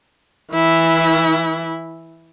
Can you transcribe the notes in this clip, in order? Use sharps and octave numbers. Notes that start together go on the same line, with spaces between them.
E3 E4